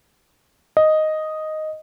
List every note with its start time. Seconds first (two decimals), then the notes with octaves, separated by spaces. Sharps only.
0.77 D#5